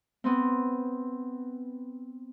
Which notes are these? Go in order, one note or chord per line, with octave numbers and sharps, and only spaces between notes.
B3 C4